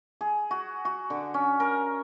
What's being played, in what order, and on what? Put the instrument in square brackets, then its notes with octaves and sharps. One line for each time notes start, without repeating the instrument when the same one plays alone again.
[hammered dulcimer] G#4
F#4
F#4
D3
C#4
A#4